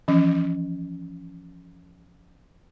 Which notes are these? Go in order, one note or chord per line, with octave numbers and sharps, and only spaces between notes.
E3 F3 C#4